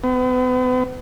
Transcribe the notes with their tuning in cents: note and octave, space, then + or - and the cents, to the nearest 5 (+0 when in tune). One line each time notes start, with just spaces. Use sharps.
B3 +40